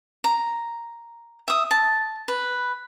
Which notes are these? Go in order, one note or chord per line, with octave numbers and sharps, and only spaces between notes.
A#5
E5 D#6
A5
B4